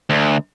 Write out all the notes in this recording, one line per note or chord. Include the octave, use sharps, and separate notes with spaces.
D2